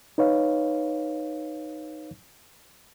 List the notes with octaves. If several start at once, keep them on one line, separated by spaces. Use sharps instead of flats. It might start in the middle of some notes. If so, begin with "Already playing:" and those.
D#4 B4 C#5 F5